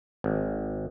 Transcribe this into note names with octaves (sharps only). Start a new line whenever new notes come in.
G#1